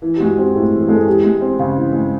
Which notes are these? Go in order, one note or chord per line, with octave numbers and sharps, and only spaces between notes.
E3
G4
G#3 F#4
C4 G4
A2 G#4
E3
G#4
G#3 A4
G#4
E3 G4
G#3
C4
C#3
E3
G#3